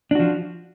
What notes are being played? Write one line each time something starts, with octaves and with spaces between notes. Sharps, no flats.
F3 D4 F#4